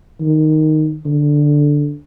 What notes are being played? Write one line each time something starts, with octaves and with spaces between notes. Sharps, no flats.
D#3
D3